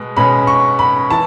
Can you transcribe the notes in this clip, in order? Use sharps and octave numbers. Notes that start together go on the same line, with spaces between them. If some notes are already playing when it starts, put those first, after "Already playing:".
Already playing: B2 G#3
B2 G#3 C#4 B5
C#6
B5
E3 A5